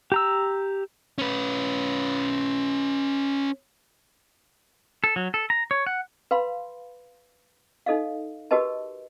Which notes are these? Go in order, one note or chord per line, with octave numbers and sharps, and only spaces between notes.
G4 A#5 E6
C#4 B4
A4
F#3
A4
A#5
C#5
F#5
B4 F5 B5 C6
D#4 A4 D#5 F5
F#4 G4 A#4 B4 D#5 A5